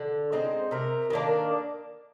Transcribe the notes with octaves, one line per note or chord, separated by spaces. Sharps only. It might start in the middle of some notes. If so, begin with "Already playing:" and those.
Already playing: D3
G#3 C4 D#4 C5
C3 A#4
D#3 A#3 D4